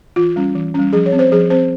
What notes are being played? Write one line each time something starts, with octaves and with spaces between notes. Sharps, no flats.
E3 F4
G3 C#4
E3
G3 C#4
F3 G#4
C#5
C4
C5
F3 G#4
C4 C5